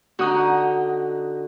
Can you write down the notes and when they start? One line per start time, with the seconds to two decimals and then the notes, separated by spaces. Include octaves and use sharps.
0.19 D3 D#4 F#4 D#6